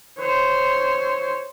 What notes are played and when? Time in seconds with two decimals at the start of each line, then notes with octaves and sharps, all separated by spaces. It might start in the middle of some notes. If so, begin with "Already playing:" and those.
0.19 C5 C#5